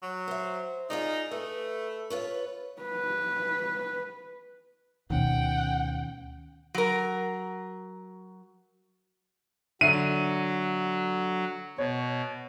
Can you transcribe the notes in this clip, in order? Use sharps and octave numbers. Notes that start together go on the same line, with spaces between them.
F#3
C5 E5
D#4 F4 G#4 D5
A3 B4
F4 B4 C#5
B4
D2 B2 D#3 C#4 F#5 G5
F#3 A#4
D3 F#3 E5 C7 D#7
B2 C#5